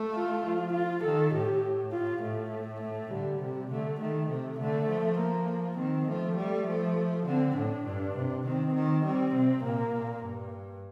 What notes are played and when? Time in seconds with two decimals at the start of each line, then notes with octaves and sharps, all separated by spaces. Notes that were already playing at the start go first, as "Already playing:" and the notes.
Already playing: A3
0.15 F4
0.44 F3
0.73 F4
1.04 D#3 A4
1.33 A2 G4
1.92 F4
2.22 A2 A3
2.81 A3
3.11 D3 G3
3.40 C3
3.70 D3 A3
4.00 D#3 A3
4.29 C3
4.59 D3 A3
4.89 F3
5.18 A#3
5.78 D#3 C4
6.08 F3 A3
6.37 G3
6.67 F3
7.26 D3 C4
7.56 A2 D4
7.86 G2
8.16 C3
8.45 D#3 C4
8.74 D#3
9.05 G3 C4
9.34 C3
9.63 A#2 A#3
9.94 A#2
10.23 G2